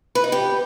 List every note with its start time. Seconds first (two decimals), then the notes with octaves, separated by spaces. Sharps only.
0.15 B4
0.24 D#4
0.32 G4